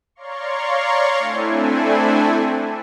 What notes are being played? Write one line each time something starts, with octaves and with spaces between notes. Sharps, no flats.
C#5 D5 F5 A#5 C6 C#6
A3 C4 D4 E4 A4 G#5